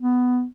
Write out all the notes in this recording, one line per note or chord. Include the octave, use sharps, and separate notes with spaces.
B3